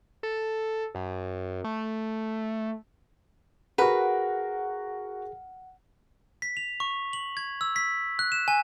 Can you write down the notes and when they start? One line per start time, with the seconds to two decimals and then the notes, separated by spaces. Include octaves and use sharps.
0.23 A4
0.95 F#2
1.64 A3
3.78 F#4 G#4 A#4 B4 F#5
6.42 B6
6.57 F7
6.80 C#6
7.13 F#7
7.37 G#6
7.61 E6
7.76 B6
8.19 F#6
8.32 E7
8.48 G#5